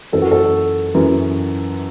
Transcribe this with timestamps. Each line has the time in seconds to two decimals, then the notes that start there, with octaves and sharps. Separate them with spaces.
0.12 F#2 E3 A4
0.22 F#4
0.32 A4
0.94 F#2 E3